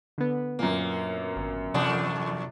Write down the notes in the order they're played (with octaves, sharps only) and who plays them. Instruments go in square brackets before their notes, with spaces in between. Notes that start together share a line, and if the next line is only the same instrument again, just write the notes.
[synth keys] D3 B3
[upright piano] F#2 A#2 [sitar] A#3
[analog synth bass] G#1
[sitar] E2 D4 [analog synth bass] C3